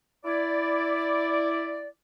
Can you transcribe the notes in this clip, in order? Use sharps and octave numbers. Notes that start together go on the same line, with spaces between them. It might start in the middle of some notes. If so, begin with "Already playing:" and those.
E4 D5